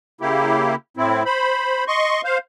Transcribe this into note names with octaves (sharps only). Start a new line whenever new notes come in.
C#3 A#3 E4 G4
A2 C4 E4
C5 B5
D#5 C6 C#6
C5 F5